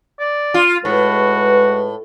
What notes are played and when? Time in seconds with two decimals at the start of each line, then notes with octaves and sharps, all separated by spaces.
0.19 D5
0.54 F4
0.85 A2 G#3 F#4 B4